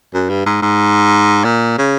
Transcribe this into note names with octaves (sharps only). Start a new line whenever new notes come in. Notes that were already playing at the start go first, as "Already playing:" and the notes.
F#2
G2
G#2
G#2
A#2
C#3